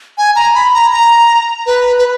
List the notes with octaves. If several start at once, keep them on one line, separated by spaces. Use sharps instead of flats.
G#5
A#5
B5
A#5
A#5
B4
B4